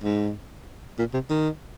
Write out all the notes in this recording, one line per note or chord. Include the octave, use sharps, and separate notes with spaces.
G#2
A#2
C3
D#3